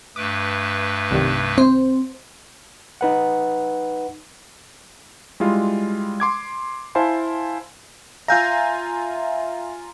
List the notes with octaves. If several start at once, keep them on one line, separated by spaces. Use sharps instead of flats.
G2 A3 B4 D6
C2 D#3 G3
C4 C5
D#4 B4 F#5
G3 G#3 E4 F4
C6 D6 G#6
E4 C5 F5 G#5 A5 C6
F4 E5 F5 G#5 A#5 E6 G6 A#6